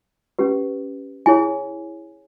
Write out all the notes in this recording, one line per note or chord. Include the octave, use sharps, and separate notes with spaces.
C#4 G4 B4
E4 G#4 C#5 G#5